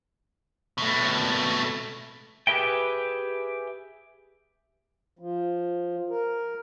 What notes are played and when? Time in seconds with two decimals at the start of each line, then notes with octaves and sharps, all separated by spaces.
0.78 B2 A3
2.47 G4 G#4 B4 E5 G5
5.19 F3
6.10 A#4